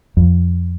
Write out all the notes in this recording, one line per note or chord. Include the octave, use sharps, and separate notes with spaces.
F2